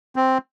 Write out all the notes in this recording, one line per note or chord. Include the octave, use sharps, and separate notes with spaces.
C4